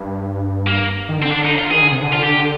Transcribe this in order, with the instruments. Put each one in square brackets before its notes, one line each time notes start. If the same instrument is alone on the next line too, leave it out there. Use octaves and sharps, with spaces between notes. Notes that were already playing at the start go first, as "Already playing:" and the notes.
Already playing: [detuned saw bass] G2
[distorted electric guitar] A#3
[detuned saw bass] D#3
[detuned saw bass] D3 [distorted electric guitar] C4
[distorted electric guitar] D4
D#4
F4
[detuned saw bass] D#3 [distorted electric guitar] G#4
[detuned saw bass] D3
C3
D3
[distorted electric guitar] F4
G4